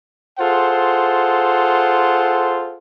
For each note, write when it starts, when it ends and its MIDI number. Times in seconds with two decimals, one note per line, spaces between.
0.39 2.78 65
0.39 2.78 68
0.39 2.78 69
0.39 2.78 72
0.39 2.78 78